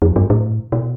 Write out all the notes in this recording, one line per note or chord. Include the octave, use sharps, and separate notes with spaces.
F2
G2
A2
B2